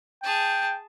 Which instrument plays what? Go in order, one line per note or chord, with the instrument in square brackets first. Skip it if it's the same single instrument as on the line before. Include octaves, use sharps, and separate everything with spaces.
[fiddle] G#4 A5 [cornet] G5